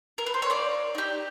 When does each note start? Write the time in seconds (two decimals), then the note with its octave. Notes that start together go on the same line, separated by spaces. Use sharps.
0.18 A#4
0.26 B4
0.34 C5
0.42 C#5
0.50 A#3 D5
0.95 D#4 G4